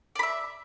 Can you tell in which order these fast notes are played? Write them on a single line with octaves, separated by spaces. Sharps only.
D5 B5 E5